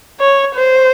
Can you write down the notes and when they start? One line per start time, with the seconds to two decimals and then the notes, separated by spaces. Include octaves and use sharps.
0.20 C#5
0.55 C5